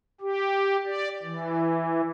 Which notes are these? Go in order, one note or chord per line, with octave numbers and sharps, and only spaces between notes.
G4
D5
E3